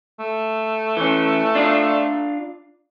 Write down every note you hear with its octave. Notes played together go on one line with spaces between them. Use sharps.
A3
E3 C#4
D4 F4 D5